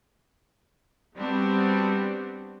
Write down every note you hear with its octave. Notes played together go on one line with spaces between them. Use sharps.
G3 B3 C4 D4 F#4